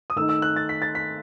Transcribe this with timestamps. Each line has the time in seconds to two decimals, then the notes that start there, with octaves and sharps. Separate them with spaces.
0.10 D#6
0.16 D#3 A3 D#4 E6
0.29 E6
0.42 F#6
0.56 A6
0.69 B6
0.82 A6
0.95 B6